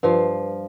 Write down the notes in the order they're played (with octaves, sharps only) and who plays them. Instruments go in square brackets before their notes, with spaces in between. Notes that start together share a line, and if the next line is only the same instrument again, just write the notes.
[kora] G2 F3 F5